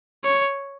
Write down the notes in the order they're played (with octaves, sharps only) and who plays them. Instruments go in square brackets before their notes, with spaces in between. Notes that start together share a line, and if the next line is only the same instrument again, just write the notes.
[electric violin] C#5